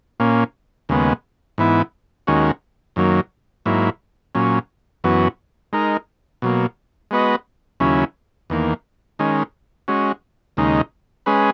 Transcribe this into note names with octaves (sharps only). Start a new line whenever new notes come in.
A#2 A#3 C#4
D#2 C#3 G#3 B3
G#2 E3 B3 E4
D#2 D#3 G#3 C#4 F#4
F#2 D#3 F#3 A#3
G#2 F#3 A#3 E4
A#2 F#3 C#4
F#2 E3 B3 F#4
G#3 D#4 A#4
B2 F#3 A#3
G#3 B3 F#4 B4 D#5
D#2 C#3 F#3 C#4 E4
E2 D#3 A#3
D#3 G#3 C#4
G#3 C#4 F#4
D#2 C#3 G#3 D#4
G#3 C#4 G#4 B4